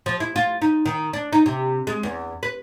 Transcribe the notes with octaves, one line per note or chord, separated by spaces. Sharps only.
F3
E4
F4
D#4
D#3
D4
D#4
C3
G#3
E2
B4